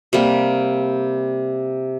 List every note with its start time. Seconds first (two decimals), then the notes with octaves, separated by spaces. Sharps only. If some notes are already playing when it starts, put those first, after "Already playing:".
0.13 C3 G3 A#3